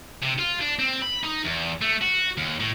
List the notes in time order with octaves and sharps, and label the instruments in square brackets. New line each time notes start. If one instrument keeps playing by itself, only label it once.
[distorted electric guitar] C3
F4
D4
C4
B5
D#4
E2
A3
F#4
D#2
A2